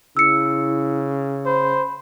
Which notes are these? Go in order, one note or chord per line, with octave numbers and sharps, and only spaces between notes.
C#3 E4 E6 C#7
C5 B5